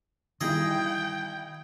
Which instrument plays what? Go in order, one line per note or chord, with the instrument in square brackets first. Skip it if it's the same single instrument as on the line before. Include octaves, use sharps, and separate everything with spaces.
[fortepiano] B1 G2 E3 [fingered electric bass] D#3 [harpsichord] G#4 D#5 [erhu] G5